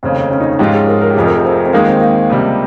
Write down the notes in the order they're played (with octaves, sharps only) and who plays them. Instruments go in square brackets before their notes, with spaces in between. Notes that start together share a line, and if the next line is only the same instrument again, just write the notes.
[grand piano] F1 D#2 C#3 [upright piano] C4
[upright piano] C#4
D#4
[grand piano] G#2 F3 G#3 C#4 F4 [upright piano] G4
[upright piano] G#4
A#4
A#4
G4
[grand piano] F1 F2 C3 F3 [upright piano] G#4
[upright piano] A#4
G#4
C4
C4
[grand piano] D#2 D#3 G#3 D#4 [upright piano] A#3
[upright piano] C4
A#3
[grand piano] C#2 C3 G3